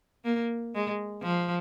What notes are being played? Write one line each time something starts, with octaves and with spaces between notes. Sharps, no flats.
A#3
G#3
F3